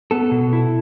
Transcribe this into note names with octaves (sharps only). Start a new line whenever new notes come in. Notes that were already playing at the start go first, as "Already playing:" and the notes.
B3 A4
B2
E4